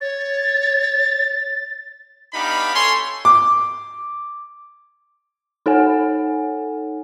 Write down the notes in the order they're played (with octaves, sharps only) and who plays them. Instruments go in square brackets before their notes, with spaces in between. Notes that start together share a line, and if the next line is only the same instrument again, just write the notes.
[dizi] C#5 [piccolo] A6
[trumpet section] B3 D4 D#4 G4 F5 B5
A4 C#5 G#5 C6
[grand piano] D6
[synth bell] D#4 A4 C#5 F#5 G#5